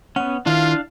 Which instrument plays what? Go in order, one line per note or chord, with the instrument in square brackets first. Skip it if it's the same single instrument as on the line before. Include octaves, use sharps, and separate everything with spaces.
[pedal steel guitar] B3 C#4 [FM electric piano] F#5
[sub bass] D#3 [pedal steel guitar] D4 F5 [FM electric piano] E4 [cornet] F4